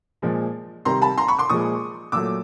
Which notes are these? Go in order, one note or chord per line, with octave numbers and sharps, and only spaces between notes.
A#2 F3 G#3
C3 D#3 G3 A#5 C6
A5 B5
A#5 C6
B5 C#6
C6 D6
A#2 F3 G#3 C#6 D#6
A#2 F#3 A3 D6 E6